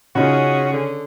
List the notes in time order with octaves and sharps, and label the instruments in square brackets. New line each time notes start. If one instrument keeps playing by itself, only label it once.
[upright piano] C#3 D#4 F4 [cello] C#4 G#4 [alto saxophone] F#4
[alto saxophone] D3